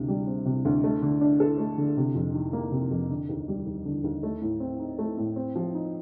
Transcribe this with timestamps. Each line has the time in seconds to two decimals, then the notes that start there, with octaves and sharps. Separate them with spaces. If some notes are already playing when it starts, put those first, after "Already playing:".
Already playing: D2 C3
0.08 G3
0.27 C4
0.45 C3
0.65 D2
0.84 A3
1.02 D3
1.21 D4
1.40 A4
1.58 A3
1.77 D3
1.97 C3
2.15 F2
2.34 D#3
2.53 A#3
2.72 C3
2.91 F2
3.09 D3
3.29 D#2
3.48 G3
3.67 D#2
3.85 D3
4.04 D#2
4.23 A3
4.41 A2
4.60 C4
4.79 D#4
4.99 A3
5.17 A2
5.36 C4
5.55 F3
5.74 D#4